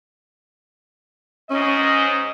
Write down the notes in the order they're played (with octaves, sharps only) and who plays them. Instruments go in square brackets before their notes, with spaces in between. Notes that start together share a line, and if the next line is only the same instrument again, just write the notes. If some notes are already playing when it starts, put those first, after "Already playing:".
[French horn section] G#2 D#5 [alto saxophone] C#4